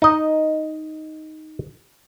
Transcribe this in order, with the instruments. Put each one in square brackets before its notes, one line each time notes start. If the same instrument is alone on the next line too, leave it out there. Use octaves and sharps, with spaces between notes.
[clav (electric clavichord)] D#4 D#5